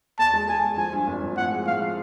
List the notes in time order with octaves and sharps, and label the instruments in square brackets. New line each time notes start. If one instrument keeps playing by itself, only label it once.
[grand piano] E2 [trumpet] A5
[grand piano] G#3
[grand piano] G#3 [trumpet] G#5
[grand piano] E2
[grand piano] F3 [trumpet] G#5
[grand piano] G2
G#1
F3
[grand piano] A2 [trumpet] F#5
[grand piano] G#3
[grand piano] A2 [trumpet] F5
[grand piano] F3